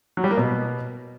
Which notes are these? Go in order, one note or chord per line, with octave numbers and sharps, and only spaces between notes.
F#3
G3
A#3
B2